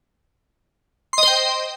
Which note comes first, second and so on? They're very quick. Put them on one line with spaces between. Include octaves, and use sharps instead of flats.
C6 D#5 C5 G5